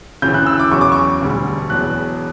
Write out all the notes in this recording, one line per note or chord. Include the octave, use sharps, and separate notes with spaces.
D2 C#3 E3 G6
F#6
E6
D6
E2 C#3 F#3 C#6
D6
C#6
E1 D2 D3 G3
E1 E2 B2 F#3 F#6